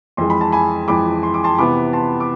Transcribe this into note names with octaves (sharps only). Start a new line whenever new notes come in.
F2 E3 G#3 C6
B5
A5
G#5 B5
F2 E3 G#3 B5 D6
C6
D6
A5 C6
C3 E3 B3 B5 D6
A5 C6
D6